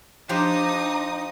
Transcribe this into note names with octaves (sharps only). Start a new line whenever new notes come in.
F3 D4 D#4 G4 C5 D#6